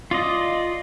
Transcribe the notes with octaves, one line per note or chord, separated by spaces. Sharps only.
F4 D5 D#5